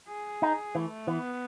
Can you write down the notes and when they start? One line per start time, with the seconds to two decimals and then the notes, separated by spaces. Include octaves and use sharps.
0.09 G#4
0.42 D#4
0.75 E3 A3
1.07 E3 B3